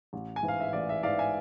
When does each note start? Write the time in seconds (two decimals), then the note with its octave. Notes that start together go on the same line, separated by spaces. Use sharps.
0.13 A1
0.36 G#5
0.43 G#2 E3
0.48 F5
0.60 E5
0.73 A1 D5
0.89 E5
1.03 G#2 E3 D5 F5
1.19 E5 G#5